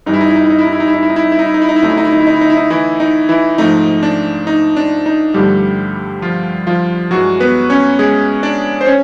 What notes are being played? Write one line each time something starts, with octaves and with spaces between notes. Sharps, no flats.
G2 E3 G3 D#4
E4
D#4
E4
D#4
E4
D#4
E4
D#4
E4
D#4
E4
D#4
E4
D#4
E4
D#4
E4
D#4
E4
D#4
E4
D#4
E4
D2 D3 F#3 A3 D#4
E4
D#4
E4
D#4
E4
D#4
E4
D#4
E4
D#4
E3 E4
D#4
E3 E4
G#2 F3 A3 D#4
D4
D#4
D4
D#4
G2 D3 F3 G3 A3 G4
F3 F4
F3 F4
G2 E3 F#3 G#3 F#4
B3 B4
C#4 C#5
G#3 G#4
D4 D5
C5
C#4 C#5